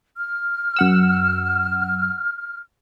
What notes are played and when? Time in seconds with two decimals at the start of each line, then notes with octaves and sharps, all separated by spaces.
0.17 F6
0.76 F#2 F#5 E6